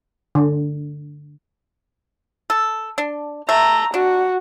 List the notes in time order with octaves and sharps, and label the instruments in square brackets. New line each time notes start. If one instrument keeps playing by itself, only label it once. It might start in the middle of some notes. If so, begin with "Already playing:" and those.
[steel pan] D3
[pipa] A4
D4
[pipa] A3 [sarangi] A#5
[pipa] D4 [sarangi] F#4